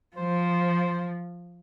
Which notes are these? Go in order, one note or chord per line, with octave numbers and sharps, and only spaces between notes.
F3 C5